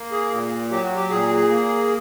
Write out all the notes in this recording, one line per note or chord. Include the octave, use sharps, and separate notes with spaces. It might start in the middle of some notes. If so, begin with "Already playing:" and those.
Already playing: A#3
G#4
A#2
F#3 G4
F#4
G4
A#2 G#4
A#3